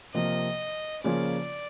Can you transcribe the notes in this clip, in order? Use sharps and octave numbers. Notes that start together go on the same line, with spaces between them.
C3 F3 A#3 D#5
C#3 F3 A#3 C#4 F4 D5